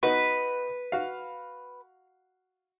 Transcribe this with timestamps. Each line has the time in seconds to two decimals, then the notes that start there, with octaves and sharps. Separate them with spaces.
0.03 B3 D#4 F#4 B4
0.92 F#4 F5